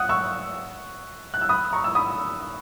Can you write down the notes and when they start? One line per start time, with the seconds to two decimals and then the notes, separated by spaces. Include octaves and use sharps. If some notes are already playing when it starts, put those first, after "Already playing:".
Already playing: F#5 D#6 F#6
0.09 C#6 E6
1.34 F#6
1.41 E6
1.49 B5 D#6
1.73 A#5 C#6
1.84 E6
1.95 B5 D#6